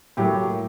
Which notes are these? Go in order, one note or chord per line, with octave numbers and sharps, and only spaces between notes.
A2 F#3 A#3 G4